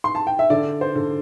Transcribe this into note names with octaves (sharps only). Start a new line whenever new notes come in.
C6
A5
G5
E5
D3 D5
C5
D3